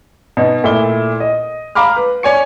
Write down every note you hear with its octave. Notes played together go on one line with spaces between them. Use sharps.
B2 D#4
A#2 A3 E4 G7
D#5
F5 A#5 B5 D6 F6
B4
C#5 D5 G#5 C#6 C#7